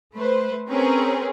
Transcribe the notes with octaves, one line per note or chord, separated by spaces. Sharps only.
A3 B4 C5
C4 C#4 G#4 A#4 B4